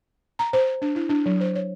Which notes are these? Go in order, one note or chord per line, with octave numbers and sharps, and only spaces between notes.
A#5
C5
D4
E4
D4
F#3
C5
C#5